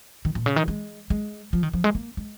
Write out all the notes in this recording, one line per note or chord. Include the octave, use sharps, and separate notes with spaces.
D#3
A#2
C#3
D#3
G#3
G#3
F3
D#3
F3
G#3
A#3
G#3